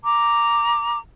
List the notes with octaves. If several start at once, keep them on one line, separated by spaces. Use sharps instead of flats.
A#5 D6